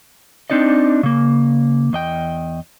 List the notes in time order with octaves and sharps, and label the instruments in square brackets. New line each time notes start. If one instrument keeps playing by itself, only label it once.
[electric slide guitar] C4 D4 D#4 D5 D#5
C#3 A#3
E2 D#5 G5